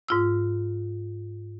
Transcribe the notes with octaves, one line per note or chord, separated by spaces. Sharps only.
G#2 F4 E6